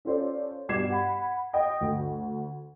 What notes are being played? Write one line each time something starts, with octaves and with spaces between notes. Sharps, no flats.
C#4 F4 A4 C5 D5
G2 B2 D6 G#6 C7 E7
F#5 B5
D#5 G5
D2